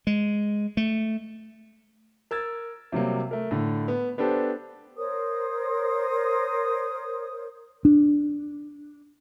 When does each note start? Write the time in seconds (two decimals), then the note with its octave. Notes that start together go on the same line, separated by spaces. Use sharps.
0.07 G#3
0.77 A3
2.31 A#4 E6 G#6 A6
2.92 C3 F#3 G3 A#3
3.31 A3 A#4
3.51 A2 D3
3.88 B3
4.18 B3 D4 G4 A4 C5
4.96 A#4 C5 C#5 D#6
7.85 D4